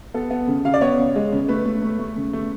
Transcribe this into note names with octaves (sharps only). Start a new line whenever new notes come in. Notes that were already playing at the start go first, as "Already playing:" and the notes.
B3 A4
B3
C#3
C#3 F5
D5
B3 C#5
C#3
G#3
C#3
A3 B4
A3
A3
A3
C#3
A3